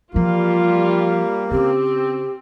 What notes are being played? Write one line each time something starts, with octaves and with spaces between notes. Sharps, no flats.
E3 F3 G3 A#3 F4
C#3 C4 C#4 G4